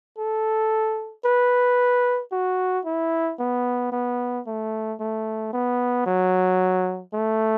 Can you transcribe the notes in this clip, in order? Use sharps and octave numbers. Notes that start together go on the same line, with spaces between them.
A4
B4
F#4
E4
B3
B3
A3
A3
B3
F#3
A3